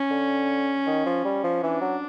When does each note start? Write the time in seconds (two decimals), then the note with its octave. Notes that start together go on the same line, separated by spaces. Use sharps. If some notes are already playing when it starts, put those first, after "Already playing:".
Already playing: C#4
0.10 D3
0.87 D#3
1.06 F3
1.24 G3
1.44 F3
1.62 E3 D4
1.81 F#3